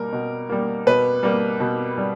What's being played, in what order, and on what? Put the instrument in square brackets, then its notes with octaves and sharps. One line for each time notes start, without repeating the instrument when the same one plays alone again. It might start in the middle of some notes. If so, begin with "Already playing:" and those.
Already playing: [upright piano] B2 G3 A#3 [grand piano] A#4
[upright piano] B2
G3 A#3
[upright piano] B2 [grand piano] B4
[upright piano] G3 A#3
B2
G3